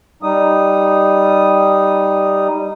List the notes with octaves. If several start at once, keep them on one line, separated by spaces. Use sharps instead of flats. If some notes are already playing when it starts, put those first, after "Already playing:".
G3 D#4 D#6